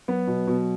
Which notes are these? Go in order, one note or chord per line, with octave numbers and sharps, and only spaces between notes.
F#3 B3
B2
B2